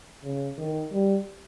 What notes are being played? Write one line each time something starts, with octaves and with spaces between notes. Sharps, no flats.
C#3
D#3
G3